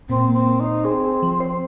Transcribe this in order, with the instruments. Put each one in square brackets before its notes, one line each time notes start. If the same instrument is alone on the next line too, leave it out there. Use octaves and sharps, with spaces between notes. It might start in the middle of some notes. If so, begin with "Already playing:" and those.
[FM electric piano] A#2 [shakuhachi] C4
[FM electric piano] A#3
[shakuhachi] C4
[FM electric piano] A#3
[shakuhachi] D#4
[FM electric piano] C5
[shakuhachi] C4 [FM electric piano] G#4
[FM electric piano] G#4
F3
C5